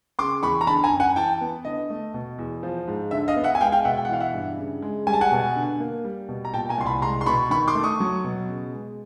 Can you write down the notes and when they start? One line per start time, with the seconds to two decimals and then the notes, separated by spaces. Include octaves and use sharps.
0.19 C#3 C6 D6
0.43 E2 B5 C#6
0.61 A#5
0.67 D3 A5 B5
0.84 G#5 A#5
0.92 F#2
1.00 F#5 G#5
1.16 E3 G5 A5
1.41 B3
1.65 D3 D#5
1.90 A3
2.14 B2
2.39 E2
2.63 F3
2.87 G#2
3.11 D3 E5
3.28 D#5 F5
3.36 B3
3.44 E5 F#5
3.55 G#5
3.61 G#3 F5 G5
3.72 F5 G5
3.85 B2 E5 F#5
3.97 G5
4.05 F#5
4.09 E3 F5
4.20 E5 F#5
4.34 G2
4.58 C#3
4.82 G#3
5.07 G3 G#5
5.13 A5
5.21 F#5 G#5
5.32 B2
5.56 D3
5.80 A#3
6.04 G3
6.29 B2
6.45 A#5
6.53 A#2 G5 A5
6.69 G#5 A#5
6.78 C2 C6
6.86 A5 B5
7.02 G#3 A#5 C6
7.21 C6
7.26 B2 B5 C#6
7.50 D#3 B5 C#6
7.68 C6 D6
7.75 A3
7.83 C#6 D#6
8.00 F#3
8.24 B2
8.49 C#3
8.73 G#3